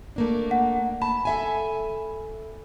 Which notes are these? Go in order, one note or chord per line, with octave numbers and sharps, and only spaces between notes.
A3 A#3 D4
F#5
A5 B5
A4 E5 G#5